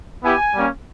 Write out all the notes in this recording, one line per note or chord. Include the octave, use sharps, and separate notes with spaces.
B3 E4 G4 G#5
G3 A#3 C#4